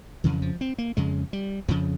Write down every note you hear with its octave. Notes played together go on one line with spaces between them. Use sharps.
F2 C#3 E3
F3
C4
A#3
F2 C#3 G#3
G3
F2 C#3 F3